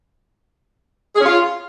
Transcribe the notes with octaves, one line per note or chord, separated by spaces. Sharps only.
G#4
C#4
F4